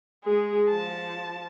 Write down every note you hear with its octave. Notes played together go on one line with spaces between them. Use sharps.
G#3 G#4
F3 A5